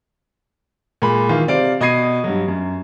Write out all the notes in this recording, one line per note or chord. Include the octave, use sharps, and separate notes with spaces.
A#2 G#3 B5
D#3 E3 F4
C3 C5 D5 F5 D7
B2 D#5 B5 G#6 C7 D#7
G2 F#3
F#2